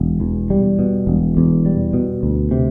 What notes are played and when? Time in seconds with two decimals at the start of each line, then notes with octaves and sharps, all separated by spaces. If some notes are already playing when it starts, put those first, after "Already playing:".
Already playing: E1
0.20 E2
0.50 G3
0.79 B2
1.07 E1
1.37 E2
1.66 G3
1.94 B2
2.23 D2
2.51 C3